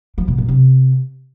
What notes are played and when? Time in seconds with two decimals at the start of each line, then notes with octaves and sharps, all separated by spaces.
0.18 F3
0.28 B2
0.38 A#2
0.48 C3